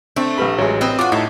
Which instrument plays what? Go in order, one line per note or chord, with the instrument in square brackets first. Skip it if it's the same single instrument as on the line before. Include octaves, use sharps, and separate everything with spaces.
[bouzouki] A3 [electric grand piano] C4 D4 [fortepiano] E5
[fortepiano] A#1 B5 [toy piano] G4 B4
[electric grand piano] A1 [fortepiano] F#3 G#3 [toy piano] C#5 E5
[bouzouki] C4 B4 D#5 [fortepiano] E6
[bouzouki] D4 F#4 [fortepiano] F4 [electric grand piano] D6
[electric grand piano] A2 [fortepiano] D#4 A5 [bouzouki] E5